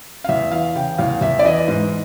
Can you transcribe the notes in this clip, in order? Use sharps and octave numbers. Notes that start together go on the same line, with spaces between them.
F5
E2 E5
E3 F5
C#3 G5
E2 F5
E2 E5
D5
E3 D#5
G#2